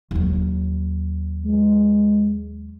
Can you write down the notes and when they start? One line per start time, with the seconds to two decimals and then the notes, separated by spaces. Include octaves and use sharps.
0.11 D#2 F#3
1.45 G#3